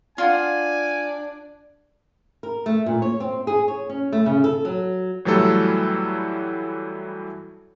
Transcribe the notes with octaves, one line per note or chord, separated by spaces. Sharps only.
D4 F4 F5 F#5 G#5
A#4
A3
A#2
C#5
C4
G#4
C#5
C#4
A3
C#3
A4
F#3
A2 E3 F#3 G3 A3 A4